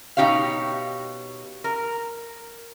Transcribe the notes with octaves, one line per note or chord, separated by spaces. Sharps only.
B2 D#4 G4 C#5 F5
A#4